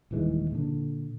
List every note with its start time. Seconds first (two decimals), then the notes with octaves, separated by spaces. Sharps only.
0.11 D#1 D#3 E3 G#3
0.52 A#2 D3